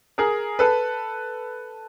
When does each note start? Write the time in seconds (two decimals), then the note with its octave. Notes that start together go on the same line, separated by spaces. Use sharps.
0.18 G#4 A#4
0.59 A4 B4